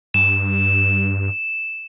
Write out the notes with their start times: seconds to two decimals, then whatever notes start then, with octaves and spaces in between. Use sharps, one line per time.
0.14 G2 E7